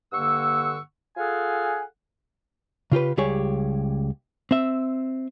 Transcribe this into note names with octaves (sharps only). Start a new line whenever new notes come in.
G2 D3 A#3 F#5 C#6 E6
F4 G#4 A4 F5 F#5 G#5
C#3 F4 G4 B4
C#2 G3 G4 G#4 C#5
C4 E5